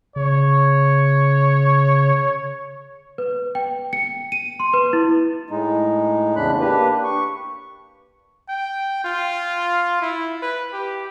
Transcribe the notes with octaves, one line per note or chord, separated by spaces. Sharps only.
C#3 C#5
B4
G5
C#7
D#7
C6
B4
E4
A2 G#3 D#4
E2 A2 C#3 D4 B5 F#6
A#3 D4 G4 B4
C#6
G5
F4
E4
B4
G4